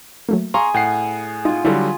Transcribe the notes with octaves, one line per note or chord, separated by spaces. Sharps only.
F#3 A3 A#3
G#4 F5 A#5 C6 C#6
A2 F#5 G5 C7
D#4 F4 G#4
D3 F#3 G3 E4 A4